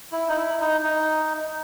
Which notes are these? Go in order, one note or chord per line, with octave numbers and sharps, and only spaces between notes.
E4
D#4
E4
D#4
D#4